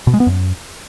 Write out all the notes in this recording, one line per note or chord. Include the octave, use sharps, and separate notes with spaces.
B2
G#3
B3
F#2